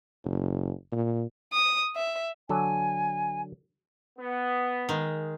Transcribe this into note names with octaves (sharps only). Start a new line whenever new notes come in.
F#1
A#2
D#6
E5
D3 F#3 A4 G#5
B3
D#3 G#3